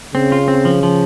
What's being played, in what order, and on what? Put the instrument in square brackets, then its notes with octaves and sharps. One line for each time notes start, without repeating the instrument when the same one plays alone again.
[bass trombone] C#3 [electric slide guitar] C4
[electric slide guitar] F4
C4
F3
F3